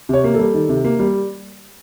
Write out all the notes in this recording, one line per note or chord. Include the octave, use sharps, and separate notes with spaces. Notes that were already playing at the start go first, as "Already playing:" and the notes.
C3 C#5
A#3
G3 A4
D#3
C3
A#3
G3